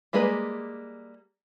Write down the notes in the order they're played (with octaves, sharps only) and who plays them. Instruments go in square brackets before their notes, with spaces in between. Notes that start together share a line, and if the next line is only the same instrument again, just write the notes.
[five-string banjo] G3 G#3 A#3 G#4 B4